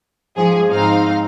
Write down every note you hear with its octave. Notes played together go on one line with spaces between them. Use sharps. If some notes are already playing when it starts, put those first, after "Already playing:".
G#2 F3 G#4
G#2 C4 D#4 F5